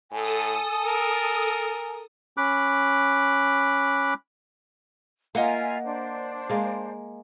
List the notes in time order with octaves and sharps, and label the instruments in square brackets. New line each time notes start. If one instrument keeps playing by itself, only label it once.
[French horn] A2 [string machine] A4 D#6 [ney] G#5
[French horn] A#4
[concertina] C#4 B5 D6 F#6
[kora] A#3 [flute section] F4 E5 G#5 [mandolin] D#5 F#5 A#5
[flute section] D4 C5
[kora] G#3 A#3